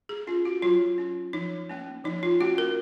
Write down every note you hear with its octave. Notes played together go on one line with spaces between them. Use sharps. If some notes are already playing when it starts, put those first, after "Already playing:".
G#4
C#4 F4
F#4
F#3 F4
C#4
F3 D#4
A#3 C#4
F3 D#4
F4
A#3 C#4 F#4
A#4